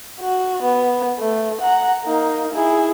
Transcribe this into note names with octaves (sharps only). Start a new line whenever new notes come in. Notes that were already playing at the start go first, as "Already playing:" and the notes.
F#4
B3
A3
F#5 A#5
A#3 D#4
E4 G#4